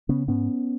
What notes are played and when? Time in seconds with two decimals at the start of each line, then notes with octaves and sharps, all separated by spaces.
0.09 C#3 B3 C#4
0.28 G#2 B3 C#4